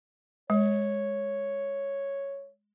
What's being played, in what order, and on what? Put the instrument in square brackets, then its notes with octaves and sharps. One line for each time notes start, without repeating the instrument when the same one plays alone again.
[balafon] G#3 [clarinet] C#5